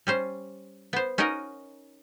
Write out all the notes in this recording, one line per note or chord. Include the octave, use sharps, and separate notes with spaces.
G3 C#4 C5
B3 C5
C#4 D#4 F#4 A#4 D#5